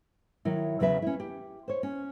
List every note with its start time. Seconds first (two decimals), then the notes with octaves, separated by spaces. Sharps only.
0.45 D#3 F#3 E4
0.80 E2 C#3 F#3 B4 E5
1.02 C#4 E4
1.20 G4
1.68 C5 C#5
1.83 C#4